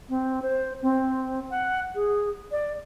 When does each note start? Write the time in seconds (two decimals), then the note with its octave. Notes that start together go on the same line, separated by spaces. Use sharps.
0.09 C4
0.42 C5
0.82 C4
1.50 F#5
1.95 G#4
2.51 D5